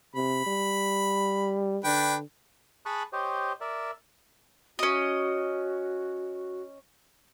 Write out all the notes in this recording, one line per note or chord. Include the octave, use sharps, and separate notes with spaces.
C3 B5
G3
D3 D4 B4 G5
G#4 A5 B5 C#6 D#6 F#6
G4 C5 C#5 D#5
A#4 D5 E5
C#4 F#4 D#5